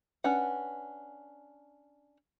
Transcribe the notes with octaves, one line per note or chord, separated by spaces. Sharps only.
C#4 D4 B4 F#5